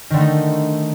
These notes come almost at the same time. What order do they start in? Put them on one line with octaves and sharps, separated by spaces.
D#3 D3 A3 D#4